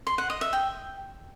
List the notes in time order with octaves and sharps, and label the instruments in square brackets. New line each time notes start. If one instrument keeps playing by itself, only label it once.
[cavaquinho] C6
F#5
D#5
E5
G5